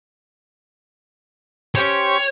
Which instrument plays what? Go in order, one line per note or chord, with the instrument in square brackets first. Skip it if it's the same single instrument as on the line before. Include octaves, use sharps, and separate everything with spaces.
[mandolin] C#4 G4 C5 [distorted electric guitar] C#5